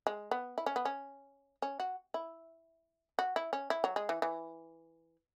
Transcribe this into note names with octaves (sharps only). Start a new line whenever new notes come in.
G#3
B3
E4
C#4
B3
C#4
C#4
F#4
E4
F#4
E4
C#4
E4
F#3
G#3
E3
E3